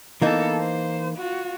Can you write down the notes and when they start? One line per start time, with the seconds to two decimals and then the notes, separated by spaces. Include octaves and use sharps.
0.22 E3 A#3 B3 D#4 A4
0.60 C5
1.17 F4 F#4